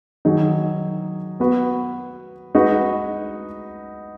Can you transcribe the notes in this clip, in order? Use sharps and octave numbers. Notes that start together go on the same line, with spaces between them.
D#3 F#3 D#4 G#4
B3 F#4 B4
G#3 D#4 F#4 B4